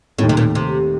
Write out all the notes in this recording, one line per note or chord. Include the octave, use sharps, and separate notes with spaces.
D#2 A2 D#3 A3
C3
A#2
C3